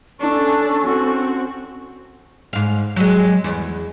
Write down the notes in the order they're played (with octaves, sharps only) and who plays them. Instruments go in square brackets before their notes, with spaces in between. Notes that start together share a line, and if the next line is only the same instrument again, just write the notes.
[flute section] C#4 A4 C#6 [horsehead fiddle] D4
[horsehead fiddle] C4 F#4
[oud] G#2 F5
F#3 G#3
E2